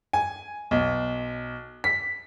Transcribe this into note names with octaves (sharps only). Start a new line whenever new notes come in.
G#5
B1
B6